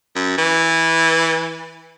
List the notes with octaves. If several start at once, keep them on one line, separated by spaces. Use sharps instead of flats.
F#2
E3